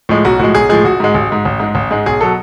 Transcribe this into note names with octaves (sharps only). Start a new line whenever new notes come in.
A2 F3 G#3
B1 F#4
A2 F3 G#3 F#4
B1 G#4
A2 F3 G#3 G#4
A1 F#4
G#2 G#3
A1
G#2 G#3
A1
G#2 G#3
A1
G#2 G#3
B1 G#4
B2 F#3 A4